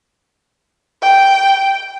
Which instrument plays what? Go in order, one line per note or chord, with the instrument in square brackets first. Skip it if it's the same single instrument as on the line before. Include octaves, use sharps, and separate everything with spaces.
[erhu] G5